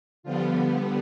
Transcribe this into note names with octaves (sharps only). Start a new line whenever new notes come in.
D3 F3 G3 B3 F4